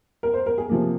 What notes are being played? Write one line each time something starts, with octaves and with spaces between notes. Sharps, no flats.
A#4
C5
A#4
G#4
C3 F3 A#3